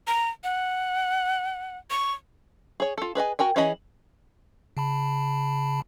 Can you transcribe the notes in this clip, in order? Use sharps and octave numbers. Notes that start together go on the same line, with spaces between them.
A#5
F#5
C#6
G#4 C#5
F4 A4
G#4 B4 D#5 G#5
F#4 A#4 G5 G#5
E3 C#4 G#4 D#5 B5
C#3 A5 B5